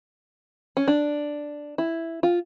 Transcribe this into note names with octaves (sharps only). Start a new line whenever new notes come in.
C#4
D4
E4
F4